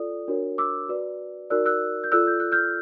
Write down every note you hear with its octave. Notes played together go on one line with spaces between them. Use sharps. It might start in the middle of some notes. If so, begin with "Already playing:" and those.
Already playing: F4 A4 D5 D#6
D4 F#4 A#4 C#5
D6 E6
F#4 B4 D5
D#4 F#4 A#4 D5 E6 F#6
E6 F#6
G6
F4 A4 D5 E6 F#6
G6
F#6
F6 G6